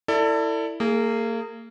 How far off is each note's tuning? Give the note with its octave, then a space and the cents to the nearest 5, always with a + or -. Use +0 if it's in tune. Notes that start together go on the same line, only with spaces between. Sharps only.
E4 +0 A4 +30 D5 +0
A#3 -30 G#4 +0